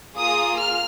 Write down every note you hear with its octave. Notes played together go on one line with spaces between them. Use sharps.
A#3 F4 G#4 D#6
F6